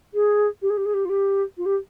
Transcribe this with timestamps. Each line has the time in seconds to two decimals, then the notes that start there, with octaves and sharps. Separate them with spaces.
0.14 G#4
0.62 G4
0.70 G#4
0.77 G4
0.85 G#4
0.94 G4
1.05 F4
1.09 G4
1.57 F4
1.65 G4